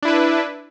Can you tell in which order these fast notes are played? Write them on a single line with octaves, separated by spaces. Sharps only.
D4 E4 B4